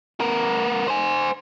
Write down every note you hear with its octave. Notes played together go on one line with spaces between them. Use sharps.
B3 A#4
C5 G#5